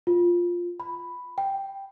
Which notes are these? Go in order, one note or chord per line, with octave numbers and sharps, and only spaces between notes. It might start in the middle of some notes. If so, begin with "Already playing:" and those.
F4
B5
G5